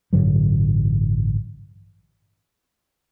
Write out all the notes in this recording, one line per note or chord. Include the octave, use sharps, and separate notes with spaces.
A1 G2 D3 F#3